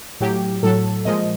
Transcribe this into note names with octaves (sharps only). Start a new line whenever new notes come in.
A2 F#3 G4
A2 F#3 A4
A#2 F3 G#3 D#5